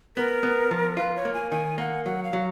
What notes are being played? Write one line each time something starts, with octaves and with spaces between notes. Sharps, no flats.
B3 A#4
B3
F3
F4 B4
C#5
A#3
G#5
D#3 G#5
A#3 F#5
F#3 F#5
F5
F#3